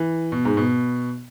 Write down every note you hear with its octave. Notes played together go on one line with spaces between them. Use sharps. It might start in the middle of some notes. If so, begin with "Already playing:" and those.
Already playing: E3
B2
G#2
B2